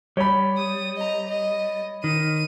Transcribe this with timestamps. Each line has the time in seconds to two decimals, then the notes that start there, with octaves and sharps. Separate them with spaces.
0.17 G3 C#5 B5
0.57 D#6
0.97 D#5 A#5
1.29 D#5
2.04 D#3 D#7